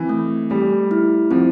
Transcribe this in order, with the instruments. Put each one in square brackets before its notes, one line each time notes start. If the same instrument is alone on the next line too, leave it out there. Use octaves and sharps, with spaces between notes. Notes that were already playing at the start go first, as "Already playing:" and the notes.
Already playing: [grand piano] E3 [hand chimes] C4
[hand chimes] A3
[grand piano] G3 [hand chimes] A3
[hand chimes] E4
[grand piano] F3 [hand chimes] C4